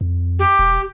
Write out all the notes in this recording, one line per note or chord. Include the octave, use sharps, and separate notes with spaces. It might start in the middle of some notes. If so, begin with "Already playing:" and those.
F2
G4
E1